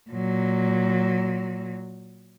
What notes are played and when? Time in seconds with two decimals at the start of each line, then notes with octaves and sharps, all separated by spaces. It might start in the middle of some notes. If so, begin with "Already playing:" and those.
0.10 A#2 F#3